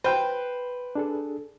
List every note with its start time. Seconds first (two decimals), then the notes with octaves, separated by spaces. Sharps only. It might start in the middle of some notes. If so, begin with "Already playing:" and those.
0.04 B4 C5 G5
0.95 D4 G#4 A4